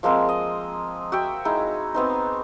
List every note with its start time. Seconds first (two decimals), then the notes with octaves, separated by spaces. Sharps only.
0.03 F3 G#3 A#3 C4
0.29 D#5
1.12 F#4 E5 G5
1.45 G#3 D#4 E4
1.94 B3 C4 D#4